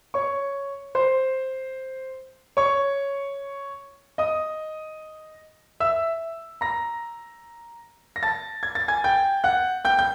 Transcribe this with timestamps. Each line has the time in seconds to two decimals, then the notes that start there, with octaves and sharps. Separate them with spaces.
0.14 C#5 C#6
0.95 C5 C6
2.57 C#5 C#6
4.18 D#5 D#6
5.80 E5 E6
6.61 A#5 A#6
8.16 A#6
8.23 A5 A6
8.63 G#6
8.75 A6
8.88 G#5 G#6
9.04 G5 G6
9.44 F#5 F#6
9.85 G5 G6
9.99 G6